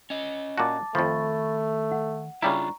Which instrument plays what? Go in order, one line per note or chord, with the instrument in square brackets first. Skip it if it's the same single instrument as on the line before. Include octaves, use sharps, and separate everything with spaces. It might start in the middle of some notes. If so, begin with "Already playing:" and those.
[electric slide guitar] C#4 D#5
[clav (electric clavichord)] A#2 F#4 [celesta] A5 D6 A6
[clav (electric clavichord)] F2 F3 [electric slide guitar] D#3 [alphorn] A3 [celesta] B5 C#6 A6
[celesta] F#5
[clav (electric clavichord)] C#3 G3 E4 [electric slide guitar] D4 F4 [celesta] A#5 C#6